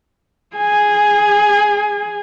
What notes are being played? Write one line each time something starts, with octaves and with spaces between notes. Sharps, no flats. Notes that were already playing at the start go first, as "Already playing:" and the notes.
G#4 G#5